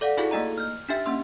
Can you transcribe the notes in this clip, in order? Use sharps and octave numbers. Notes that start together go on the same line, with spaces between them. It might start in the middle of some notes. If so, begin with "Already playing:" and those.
A4 D5 F5 F#5
D#4 E4 F#4 G#4 A4 F5
A3 A#3 D#4 D#5 A#5
F6 G6
D4 D#4 G4 E5 F6 C7
A#3 C#4 C6 E6